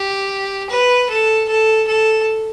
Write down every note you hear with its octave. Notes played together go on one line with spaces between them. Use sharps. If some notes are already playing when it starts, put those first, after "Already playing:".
Already playing: G4
B4
A4
A4
A4